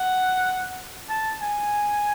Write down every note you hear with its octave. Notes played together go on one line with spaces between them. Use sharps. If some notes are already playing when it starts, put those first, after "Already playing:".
Already playing: F#5
A5
G#5